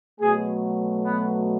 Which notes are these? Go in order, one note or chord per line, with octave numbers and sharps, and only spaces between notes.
B2 F#3 A3 G#4
B3